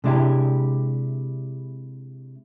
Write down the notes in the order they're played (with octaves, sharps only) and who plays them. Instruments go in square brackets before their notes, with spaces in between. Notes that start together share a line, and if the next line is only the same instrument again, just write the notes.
[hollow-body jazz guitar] C3 G#3 D4 E4 G4